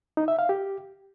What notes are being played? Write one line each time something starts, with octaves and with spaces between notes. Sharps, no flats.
D#4
E5
F5
G4